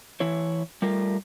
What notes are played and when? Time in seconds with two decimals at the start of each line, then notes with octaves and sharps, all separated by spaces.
0.20 E3 E4 C#5
0.82 G3 A3 F4 A#4